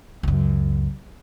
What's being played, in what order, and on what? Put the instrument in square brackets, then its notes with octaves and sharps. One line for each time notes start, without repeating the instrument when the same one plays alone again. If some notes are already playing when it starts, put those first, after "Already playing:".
[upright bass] C#2 F#2